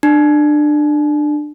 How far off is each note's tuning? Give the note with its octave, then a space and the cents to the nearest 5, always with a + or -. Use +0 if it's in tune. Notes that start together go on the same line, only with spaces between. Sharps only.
D4 +25